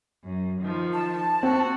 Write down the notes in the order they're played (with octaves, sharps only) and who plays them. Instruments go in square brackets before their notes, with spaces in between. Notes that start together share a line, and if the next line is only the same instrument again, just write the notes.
[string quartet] F#2
D#3 F3
[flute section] A5
[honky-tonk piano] C4 [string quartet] F#4